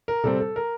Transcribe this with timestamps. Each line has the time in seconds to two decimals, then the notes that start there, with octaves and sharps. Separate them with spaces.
0.08 A#4
0.24 C3 G3 C4 A4
0.40 A4
0.56 A#4